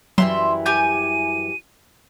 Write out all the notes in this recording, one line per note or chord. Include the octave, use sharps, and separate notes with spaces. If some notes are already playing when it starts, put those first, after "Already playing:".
F#2 E3 F#3 G3 E5 C6
G4 G#5 G6 D#7